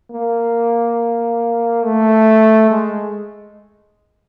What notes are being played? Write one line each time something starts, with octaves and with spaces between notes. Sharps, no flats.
A#3
A3
G#3